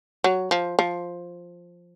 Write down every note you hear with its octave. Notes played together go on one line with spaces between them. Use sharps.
F#3
F3
F3